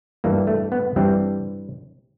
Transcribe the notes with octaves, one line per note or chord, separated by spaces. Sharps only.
G2 E3 G3 A#3
A3
B3
G2 E3 G3 C4